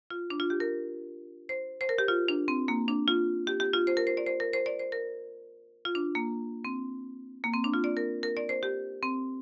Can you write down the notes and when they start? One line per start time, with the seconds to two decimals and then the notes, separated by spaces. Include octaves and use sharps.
0.10 F4
0.30 D4
0.40 F4
0.50 G4
0.60 A#4
1.49 C5
1.81 C5
1.89 A#4
1.98 G4
2.08 F4
2.28 D4
2.48 C4
2.68 A#3
2.88 D4
3.08 F4
3.47 G4
3.60 G4
3.74 F4
3.87 C5
3.97 A#4
4.07 C5
4.17 D5
4.26 C5
4.40 A#4
4.53 C5
4.66 D5
4.79 C5
4.92 A#4
5.85 F4
5.95 D4
6.15 A#3
6.65 C4
7.44 A#3
7.53 C4
7.64 D4
7.74 F4
7.84 D5
7.97 A#4
8.23 A#4
8.37 D5
8.49 C5
8.63 G4
9.03 C4